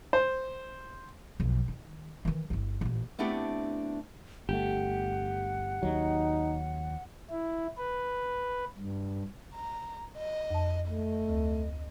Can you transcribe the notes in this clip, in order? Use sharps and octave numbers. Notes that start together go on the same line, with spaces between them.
C5
B1 F2
D#3
D#3 E3
G1 E4
A1 A#2
A3 B3 C4 D4 E4 G4
G1 A3 G4 F#5
D#2 F#3 D#4
E4
B4
G2
A#5
D#5
F2 A5
A3 D#5
D2